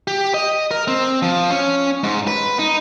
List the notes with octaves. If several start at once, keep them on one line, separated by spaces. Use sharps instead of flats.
G4
D#5
A#4
C4
F3
C#4
G#2
B4
D#4